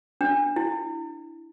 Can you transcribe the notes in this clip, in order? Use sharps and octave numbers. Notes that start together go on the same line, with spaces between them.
D4
E4